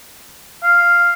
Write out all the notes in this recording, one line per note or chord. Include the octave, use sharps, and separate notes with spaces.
F5